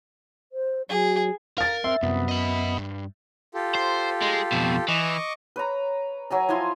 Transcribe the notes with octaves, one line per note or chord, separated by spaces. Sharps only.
C5
F#3 G#4
A#4 F5 A6
C4 E5 C6
C2 F#2 B3
D#5 B5
G2
F4 G4 A4
C5
G#3
F2 B2
E3 D#5 C#6 D6
B4 C#5 A#5
F#3 G#5 A#5
F3 E4 G#5 C6